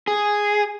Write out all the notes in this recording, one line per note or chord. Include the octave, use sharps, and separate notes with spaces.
G#4